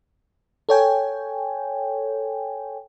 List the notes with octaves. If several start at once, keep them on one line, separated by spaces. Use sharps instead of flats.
A4 C#5 G5 G#5